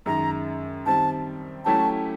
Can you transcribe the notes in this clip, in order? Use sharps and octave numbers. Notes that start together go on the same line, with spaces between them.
F#2 D#3 G#3 A#5
D#3 G3 C4 A5
F#3 A3 C#4 E4 G4 A5